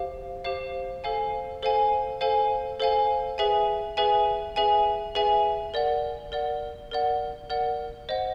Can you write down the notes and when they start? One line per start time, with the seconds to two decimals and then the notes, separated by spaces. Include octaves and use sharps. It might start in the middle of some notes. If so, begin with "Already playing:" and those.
Already playing: G4 C5 F5
0.44 G4 C5 F5
1.04 A4 C5 F5 G#5
1.63 A4 C5 F5 G#5
2.21 A4 C5 F5 G#5
2.80 A4 C5 F5 G#5
3.38 G#4 B4 E5 G#5
3.97 G#4 B4 E5 G#5
4.56 G#4 B4 E5 G#5
5.15 G#4 B4 E5 G#5
5.74 A#4 D5 F#5
6.32 A#4 D5 F#5
6.91 A#4 D5 F#5
7.50 A#4 D5 F#5
8.09 C5 D#5 F#5